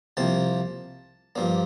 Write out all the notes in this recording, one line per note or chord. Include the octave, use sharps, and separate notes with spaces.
C2 C3 F3 A#3 A5
G2 F3 A#3 D4